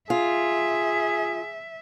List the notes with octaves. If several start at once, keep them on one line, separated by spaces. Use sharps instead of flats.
F4 G#4 E5